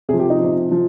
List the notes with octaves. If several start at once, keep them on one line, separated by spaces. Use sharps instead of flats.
C3 F3 G#4
G4
D#4
C3 F3
F3